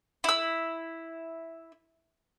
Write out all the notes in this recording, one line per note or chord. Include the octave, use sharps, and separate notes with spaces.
E4 E6